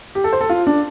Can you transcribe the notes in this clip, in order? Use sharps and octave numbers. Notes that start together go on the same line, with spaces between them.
G4
A4
C5
A4
F4
D4